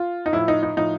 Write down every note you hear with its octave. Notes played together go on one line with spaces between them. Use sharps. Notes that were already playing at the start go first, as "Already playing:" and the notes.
Already playing: F4
D#4
A2 F3 E4
D#4
D#4
A2 F3 D#4